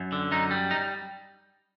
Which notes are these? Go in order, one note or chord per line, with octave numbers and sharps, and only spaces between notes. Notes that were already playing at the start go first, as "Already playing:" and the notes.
Already playing: F#2
D3
F#2 D#4
G3
D#4